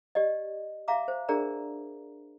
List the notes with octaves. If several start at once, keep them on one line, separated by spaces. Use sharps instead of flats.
G4 D5 D#5
E5 F5 A#5 D6
C5
D4 G#4 A#4 D5 A#5